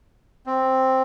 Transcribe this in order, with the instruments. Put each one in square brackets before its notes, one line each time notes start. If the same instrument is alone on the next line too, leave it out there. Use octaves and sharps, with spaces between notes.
[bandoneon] C4